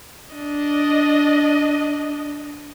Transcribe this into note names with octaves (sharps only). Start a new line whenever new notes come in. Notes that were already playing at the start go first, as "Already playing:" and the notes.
D4 D#5